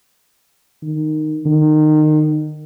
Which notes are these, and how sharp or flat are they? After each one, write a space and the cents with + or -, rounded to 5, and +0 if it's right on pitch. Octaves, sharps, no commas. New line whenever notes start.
D#3 -15
D#3 -25